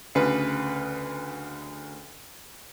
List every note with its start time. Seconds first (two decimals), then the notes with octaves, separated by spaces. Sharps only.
0.15 D2 C#3 B4